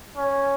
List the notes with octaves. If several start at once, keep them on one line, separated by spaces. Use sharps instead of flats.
C#4